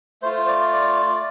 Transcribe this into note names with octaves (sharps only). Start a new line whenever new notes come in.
A3 F4 C5
D5
D5